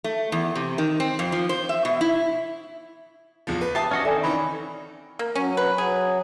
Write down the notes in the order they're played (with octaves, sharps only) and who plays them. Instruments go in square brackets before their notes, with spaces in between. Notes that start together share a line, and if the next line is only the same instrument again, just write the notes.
[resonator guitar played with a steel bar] A3
E2
C3
D#3
C4
F2
F3
C5
E5
B2
E4
[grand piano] E2 F3
B4
[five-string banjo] G4 E5 A5 [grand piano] D#6 C7
[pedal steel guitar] C#4 F#4 D#5 [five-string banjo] D4
[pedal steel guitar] D#3 C4 [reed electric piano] A4 D5 G#5 [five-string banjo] E5
[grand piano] E3 C#4 D#4 [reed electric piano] B5
[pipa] A#3
[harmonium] F#3 [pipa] C#4
[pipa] B4
[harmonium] F#3 [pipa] G#4